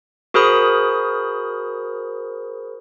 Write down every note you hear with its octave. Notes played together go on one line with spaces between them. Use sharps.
F#4 G#4 A#4 C5 B5 D#6